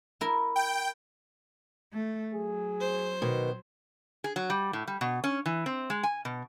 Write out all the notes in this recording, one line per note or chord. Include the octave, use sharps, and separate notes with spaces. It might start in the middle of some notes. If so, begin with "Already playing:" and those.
E4 A#4
G5
A3
F#3 G#4
C5
B2 D#3
G#4
F#3
G3
A2
G3
B2
C#4
E3
C4
G#3
G#5
B2